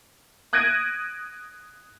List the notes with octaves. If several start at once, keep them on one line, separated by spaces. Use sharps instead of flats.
D#6 F#6 G#6 A#6 D7 D#7